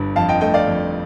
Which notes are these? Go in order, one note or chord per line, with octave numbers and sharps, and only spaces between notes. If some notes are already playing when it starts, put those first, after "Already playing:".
Already playing: G1 G2
F2 F5 A5
D#5 G5
A3 D#5 G5
D5 F5
F2